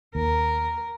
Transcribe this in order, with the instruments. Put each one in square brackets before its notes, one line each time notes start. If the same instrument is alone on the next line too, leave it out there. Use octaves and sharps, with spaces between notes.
[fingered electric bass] D#2 [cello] A#4